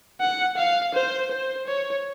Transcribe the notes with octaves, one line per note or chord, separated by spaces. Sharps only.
F#5
F5
C5
C5
C#5